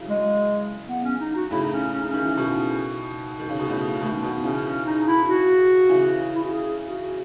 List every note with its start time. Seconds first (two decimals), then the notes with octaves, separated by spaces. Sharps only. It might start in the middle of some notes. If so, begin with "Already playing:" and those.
Already playing: C#3 E3 F#3
0.09 G#3
0.88 B3
1.03 C#4
1.20 D#4
1.35 F#4
1.51 A2 C#3 E4
1.61 D#4
1.72 C#4
1.92 C#4
2.01 D#4
2.09 D#3 C#4
2.25 E3
2.37 B2 D#3
3.39 D#3
3.49 C#3
3.59 B2
3.69 A2 C#3
4.01 B2 D#3 A3
4.14 C#4
4.22 B2 D#3 B3
4.43 C#3 E3 C#4
4.64 C#4
4.85 D#4
5.06 E4
5.27 F#4
5.89 C#3 E3
6.34 E4
6.43 F#4
6.52 G#4
6.84 F#4